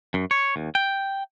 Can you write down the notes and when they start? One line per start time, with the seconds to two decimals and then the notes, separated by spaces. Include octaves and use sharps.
0.14 F#2
0.31 C#5
0.56 D#2
0.75 G5